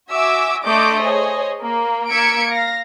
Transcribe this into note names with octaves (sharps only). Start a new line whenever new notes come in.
F#4 E5 G#5 D6 E6
A3 D4 D#5 C6 D6 G6
G#4 C5 C#5 D#5 G#5
A#3
A#3 E6 G#6 B6 C#7 D7
F5 A#6